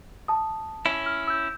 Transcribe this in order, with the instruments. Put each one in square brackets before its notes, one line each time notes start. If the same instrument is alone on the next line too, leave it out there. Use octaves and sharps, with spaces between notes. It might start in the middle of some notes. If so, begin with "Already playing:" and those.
[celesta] A5 D#6
[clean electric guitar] C#4 E4
[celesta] F6
E6 G6